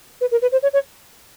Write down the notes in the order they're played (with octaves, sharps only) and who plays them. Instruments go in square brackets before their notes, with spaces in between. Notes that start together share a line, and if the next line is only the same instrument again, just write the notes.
[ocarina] B4
A#4
B4
C5
C#5
C#5